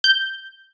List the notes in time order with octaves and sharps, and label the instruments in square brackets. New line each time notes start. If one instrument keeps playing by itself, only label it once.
[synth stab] G6